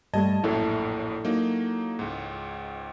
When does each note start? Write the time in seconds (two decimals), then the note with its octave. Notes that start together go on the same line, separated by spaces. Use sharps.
0.14 G2 G3 A3 D#5 A5 G#6
0.44 A#1 F#2 A2 E4 A4
1.24 F#3 A#3 D#4
1.99 C#2 G#2